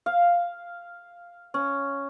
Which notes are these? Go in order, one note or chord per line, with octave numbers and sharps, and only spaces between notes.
F5
C#4